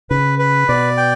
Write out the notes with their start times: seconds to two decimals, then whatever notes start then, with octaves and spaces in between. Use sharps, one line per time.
0.10 C#3 B4
0.39 B4
0.69 B2 D5
0.97 G5